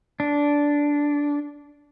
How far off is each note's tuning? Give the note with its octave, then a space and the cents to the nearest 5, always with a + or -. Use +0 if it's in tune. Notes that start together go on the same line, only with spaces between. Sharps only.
D4 -10